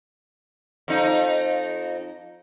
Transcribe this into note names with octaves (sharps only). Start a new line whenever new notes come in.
F2 D#4